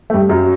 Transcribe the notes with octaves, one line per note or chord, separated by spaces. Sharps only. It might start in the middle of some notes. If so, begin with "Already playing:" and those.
A3
G2 G3
F#2 F#3